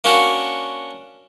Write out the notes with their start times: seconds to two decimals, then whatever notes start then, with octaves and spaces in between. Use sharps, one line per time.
0.04 A#3 C#4 D4 F#4